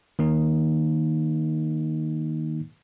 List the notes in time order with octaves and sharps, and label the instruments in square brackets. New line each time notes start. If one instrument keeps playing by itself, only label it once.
[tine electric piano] D#3 A#3 D#4